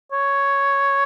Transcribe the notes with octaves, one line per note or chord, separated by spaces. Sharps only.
C#5